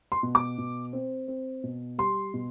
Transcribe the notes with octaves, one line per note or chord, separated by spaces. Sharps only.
C6
B2
D6
B2
C4
C4
B2
G3 C6
B2